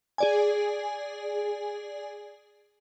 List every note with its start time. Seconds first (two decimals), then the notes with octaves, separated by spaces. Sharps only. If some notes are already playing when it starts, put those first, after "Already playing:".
0.18 G#4 D5 G#5